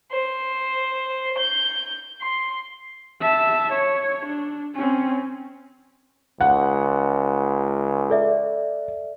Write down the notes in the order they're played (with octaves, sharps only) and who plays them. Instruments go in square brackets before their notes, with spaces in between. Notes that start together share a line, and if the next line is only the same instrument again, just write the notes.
[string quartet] C5
G6
C6
[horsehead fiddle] E5 A5
C#5
D4
C4 C#4
[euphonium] C#2 [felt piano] F#5
[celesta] A4 D5 E5